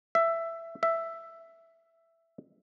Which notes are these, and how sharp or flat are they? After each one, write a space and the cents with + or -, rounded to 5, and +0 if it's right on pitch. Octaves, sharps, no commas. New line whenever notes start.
E5 +10
E5 +5